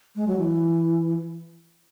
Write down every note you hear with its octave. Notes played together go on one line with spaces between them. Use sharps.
G#3
F#3
E3